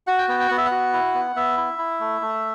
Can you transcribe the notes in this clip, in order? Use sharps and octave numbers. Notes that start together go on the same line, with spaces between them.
F#4 F#5
G5
B3 G5
G5
B3 F#5
E5
F#5
F#4
E4
B3
B3 E5
E4
E4
A3
A3